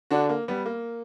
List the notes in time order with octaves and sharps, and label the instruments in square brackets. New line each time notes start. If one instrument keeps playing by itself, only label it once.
[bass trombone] D3 [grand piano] D4 F#4
[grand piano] A#3
G3 B3
A#3